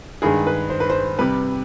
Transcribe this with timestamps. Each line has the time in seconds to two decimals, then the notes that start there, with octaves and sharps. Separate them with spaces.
0.22 G2 D#3 G#3 G#4
0.47 B4
0.70 C5
0.80 B4
0.90 C5
1.19 C3 G3 B4